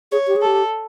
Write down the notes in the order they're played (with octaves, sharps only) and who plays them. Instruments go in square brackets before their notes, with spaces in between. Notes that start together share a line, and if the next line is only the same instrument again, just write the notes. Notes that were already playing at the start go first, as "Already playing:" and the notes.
[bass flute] G#4 [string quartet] C#5
[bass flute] G4
G#4
[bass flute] G4 [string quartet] A4